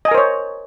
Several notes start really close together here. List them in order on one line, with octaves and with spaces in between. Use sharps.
D#5 G#5 A#4 C5 C#5